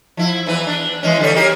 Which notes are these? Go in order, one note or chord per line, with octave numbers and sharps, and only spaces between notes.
F3 E4
E2 E3 B4
D4
E3 G#3 C#4
D3 G3 C#5
A#3 G4 G#4